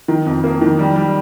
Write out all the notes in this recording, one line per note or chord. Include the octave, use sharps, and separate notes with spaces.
D#3
F2
A#3
D#3
G3
G3